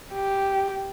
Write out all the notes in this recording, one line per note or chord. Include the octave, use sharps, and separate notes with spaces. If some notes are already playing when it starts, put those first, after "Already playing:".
G4